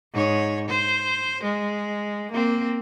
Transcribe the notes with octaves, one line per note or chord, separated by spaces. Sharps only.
G#2 C#5
C5
G#3
A#3 C4